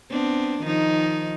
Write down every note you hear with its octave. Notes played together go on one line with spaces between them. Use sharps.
B3 C4 D4
D#3 F3 D#4